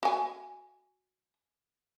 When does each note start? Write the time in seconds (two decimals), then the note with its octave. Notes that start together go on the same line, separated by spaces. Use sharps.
0.03 F#4 G#5